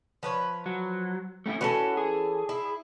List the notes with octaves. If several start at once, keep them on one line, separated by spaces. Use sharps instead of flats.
F3 B4 C#5
F#3
A3 C#4 E4
E3 C#4 F#4 A4
G#4
E4